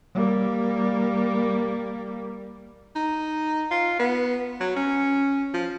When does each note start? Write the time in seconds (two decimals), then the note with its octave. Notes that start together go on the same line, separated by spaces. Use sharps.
0.15 G3 A#3
2.95 D#4
3.71 F4
3.99 B3
4.60 F#3
4.76 C#4
5.54 F3